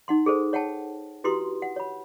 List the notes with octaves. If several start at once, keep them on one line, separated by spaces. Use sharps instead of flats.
D#4 F#5 C6
G#4 A4 C5
C#5 F#5 G5 A5
E4 F#4 G4 B4 C6 D#6
F#5
C#5 B5